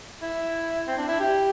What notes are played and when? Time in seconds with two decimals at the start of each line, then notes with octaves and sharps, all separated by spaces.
0.22 E4
0.87 C4
0.98 D4
1.08 E4
1.20 G4